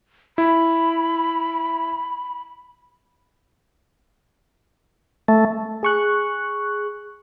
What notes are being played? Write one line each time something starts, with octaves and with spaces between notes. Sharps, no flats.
E4 B5
A3
G#4 C#6 F#6